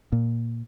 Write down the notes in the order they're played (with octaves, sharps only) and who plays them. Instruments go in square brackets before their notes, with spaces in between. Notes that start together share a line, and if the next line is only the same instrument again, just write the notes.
[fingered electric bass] A#2